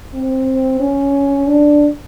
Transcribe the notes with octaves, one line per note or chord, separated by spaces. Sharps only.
C4
C#4
D4